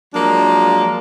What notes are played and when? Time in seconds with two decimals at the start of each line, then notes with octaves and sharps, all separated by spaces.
0.14 F3 F#3 G#3 A#3 D4